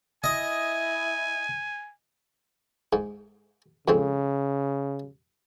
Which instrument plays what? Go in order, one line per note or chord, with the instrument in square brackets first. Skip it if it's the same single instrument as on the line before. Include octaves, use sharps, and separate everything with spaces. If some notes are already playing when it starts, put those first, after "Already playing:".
[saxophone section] E4 [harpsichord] D#5 [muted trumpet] G#5
[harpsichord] G#2
[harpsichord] F2 G#2 C4 [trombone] C#3